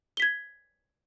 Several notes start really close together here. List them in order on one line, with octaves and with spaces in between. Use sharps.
G7 B6 G#6